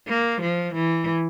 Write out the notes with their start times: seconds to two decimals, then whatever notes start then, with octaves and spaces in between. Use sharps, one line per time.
0.08 A#3
0.41 F3
0.75 E3